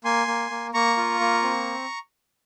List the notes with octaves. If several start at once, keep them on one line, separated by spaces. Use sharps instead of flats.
A#3 G#5 C6
A#3
A#3
A#3 A#5 C#6
F4
A#3
C4